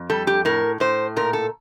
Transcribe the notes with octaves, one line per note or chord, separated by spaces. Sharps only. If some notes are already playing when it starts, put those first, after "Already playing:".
Already playing: F2
G3 A4
G4
A2 A#4
A2 C5
A#2 A#4
A4